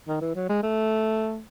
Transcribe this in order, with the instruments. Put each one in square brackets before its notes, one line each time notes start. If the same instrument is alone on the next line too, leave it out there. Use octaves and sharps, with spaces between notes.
[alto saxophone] D#3
E3
F#3
G#3
A3